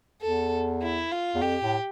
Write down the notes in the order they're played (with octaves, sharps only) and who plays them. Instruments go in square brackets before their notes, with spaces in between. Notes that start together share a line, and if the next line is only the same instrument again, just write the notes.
[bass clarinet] E2 [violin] A4
[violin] E4
F4
[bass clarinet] E2
[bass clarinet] F2 [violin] G4
[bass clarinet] A2